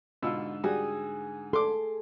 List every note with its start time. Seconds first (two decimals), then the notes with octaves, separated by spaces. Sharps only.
0.23 G#2 B2 D3 F4 E6
0.64 G3 F#4 G#4 D#6
1.53 A4 C6 D6